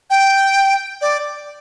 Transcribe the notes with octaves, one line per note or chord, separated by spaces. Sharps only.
G5
D5